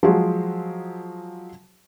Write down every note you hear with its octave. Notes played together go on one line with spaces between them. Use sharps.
F3 F#3 G#3 F#4 G#4 C5